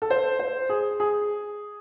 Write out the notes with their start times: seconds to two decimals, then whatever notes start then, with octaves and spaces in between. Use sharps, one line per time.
0.02 A4
0.10 C5
0.39 C5
0.69 G#4
1.00 G#4